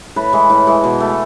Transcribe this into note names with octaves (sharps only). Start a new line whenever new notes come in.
A2 B4
E3 G#3
A2
E3 G#3
B2
A3